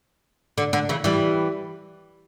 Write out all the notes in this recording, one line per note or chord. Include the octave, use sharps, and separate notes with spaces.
D3
D3
C#3 E3
E3 G3